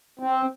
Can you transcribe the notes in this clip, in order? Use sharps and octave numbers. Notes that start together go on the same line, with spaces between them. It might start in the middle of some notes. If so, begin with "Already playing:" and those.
C4